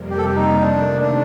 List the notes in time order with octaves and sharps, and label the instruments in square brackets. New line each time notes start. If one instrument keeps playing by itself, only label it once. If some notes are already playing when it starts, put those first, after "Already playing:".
Already playing: [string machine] F2 C3 G3 A#3
[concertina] G4
A4
G4
D#4
[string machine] C3 D#3 A3 [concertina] D4
[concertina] D4